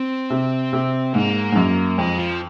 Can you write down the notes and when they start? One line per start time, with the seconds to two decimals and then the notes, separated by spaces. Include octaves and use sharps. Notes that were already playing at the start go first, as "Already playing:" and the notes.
Already playing: C4
0.30 C3
0.73 C3
1.14 G#2 A#3
1.52 G#2
1.56 F#2
1.98 F2 G#3
2.18 F3